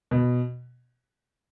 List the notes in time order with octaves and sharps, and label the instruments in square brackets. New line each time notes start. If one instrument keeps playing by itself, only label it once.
[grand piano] B2